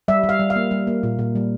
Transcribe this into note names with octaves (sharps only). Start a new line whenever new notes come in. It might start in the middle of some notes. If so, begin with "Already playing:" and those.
G3 E5
G3
F5
G3
F5
A#3
G3
A#3
A#2
A#2
G3